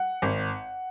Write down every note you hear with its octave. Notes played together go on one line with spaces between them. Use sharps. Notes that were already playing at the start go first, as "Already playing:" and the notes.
Already playing: F#5
G#1